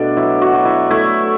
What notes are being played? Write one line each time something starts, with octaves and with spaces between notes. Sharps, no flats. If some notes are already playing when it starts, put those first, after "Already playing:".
Already playing: B2 A3 D4
F#3 E4
F#4
F#3
E4
A3 E4